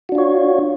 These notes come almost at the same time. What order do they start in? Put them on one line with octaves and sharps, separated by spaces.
F#4 D4 F4 C#5